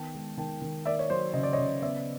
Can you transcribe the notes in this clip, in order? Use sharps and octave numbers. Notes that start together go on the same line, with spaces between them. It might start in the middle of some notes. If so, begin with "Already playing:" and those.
Already playing: D#3 B3 G5 A5
G#3
D#3 G5 A5
D#3
A#3 D5 E5
C#5
F#3 C5 D5
C#3 D#5
D5
C#5 D#5
C#3
B3 D5 E5